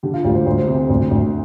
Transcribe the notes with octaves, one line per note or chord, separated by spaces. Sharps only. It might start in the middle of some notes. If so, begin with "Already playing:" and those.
D3 G4
F4
D2 G4
C5
D2 C5
C3
D2
D2